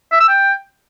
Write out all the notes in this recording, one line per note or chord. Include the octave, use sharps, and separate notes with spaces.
E5
E6
G5